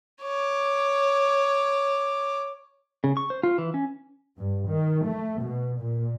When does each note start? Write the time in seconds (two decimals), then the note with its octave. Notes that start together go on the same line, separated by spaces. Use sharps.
0.22 C#5 D6
3.04 C#3
3.17 C#6
3.30 C5
3.43 F4
3.58 E3
3.74 C#4
4.38 G2
4.70 D#3
5.06 A3
5.43 B2
5.80 A#2